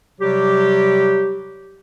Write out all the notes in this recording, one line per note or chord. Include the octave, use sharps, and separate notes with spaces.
C3 F#3 G3 G4